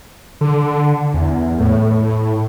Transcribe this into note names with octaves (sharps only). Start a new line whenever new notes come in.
D3
E2
A2